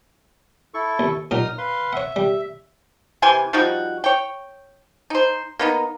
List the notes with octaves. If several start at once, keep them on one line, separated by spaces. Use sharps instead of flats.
E4 A4 C#6
D#2
A#2 F#3 D#4 F4 D#6 F6
B4 F5 C6
C#5 E5 F#5
G3
C3 E3 G#5 C6
F3 G3 D#4 F#4
C#5 G5
D#4 C5
A#3 B3 D#4